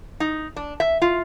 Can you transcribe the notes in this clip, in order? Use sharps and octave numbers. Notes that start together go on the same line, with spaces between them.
D#4
D4
E5
F4